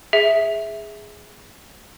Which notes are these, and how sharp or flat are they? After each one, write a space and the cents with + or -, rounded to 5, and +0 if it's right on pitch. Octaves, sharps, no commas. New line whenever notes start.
G#4 +0 E5 -5